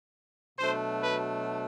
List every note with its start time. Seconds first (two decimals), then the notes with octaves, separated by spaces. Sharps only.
0.58 B2 F#3 A3 D4 C5
1.03 B4